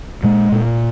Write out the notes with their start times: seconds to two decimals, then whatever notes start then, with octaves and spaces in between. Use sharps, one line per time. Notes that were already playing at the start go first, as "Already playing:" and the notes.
0.24 A#2 G#3
0.52 A#2